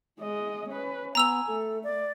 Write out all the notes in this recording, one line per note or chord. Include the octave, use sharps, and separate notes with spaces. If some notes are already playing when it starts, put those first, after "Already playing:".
G#3 D#5
C#4 B4
B3 G#5 A#5 E6 F7
A3 A4
D5